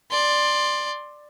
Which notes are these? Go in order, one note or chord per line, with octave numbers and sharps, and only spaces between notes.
D5 C6